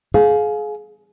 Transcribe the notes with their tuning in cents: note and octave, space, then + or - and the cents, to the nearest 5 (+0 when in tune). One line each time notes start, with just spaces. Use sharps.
G#4 +30 F5 +15